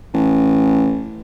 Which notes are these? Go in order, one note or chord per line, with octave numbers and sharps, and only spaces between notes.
A1